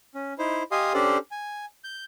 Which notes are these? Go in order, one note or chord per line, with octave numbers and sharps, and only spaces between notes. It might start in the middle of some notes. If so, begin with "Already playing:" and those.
C#4
D#4 E4 C5
G4 D#5 F5 G#5 C6 D#6
C#4 D4 G4 A4 C5 D5
G#5
G6